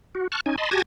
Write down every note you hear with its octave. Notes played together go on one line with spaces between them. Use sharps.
F#4
A5 C#6 F6 F#6
C#4 D#4 G#5
D#5 A5 B5 C6
F#4 G4 G#5 A5 G#6 A#6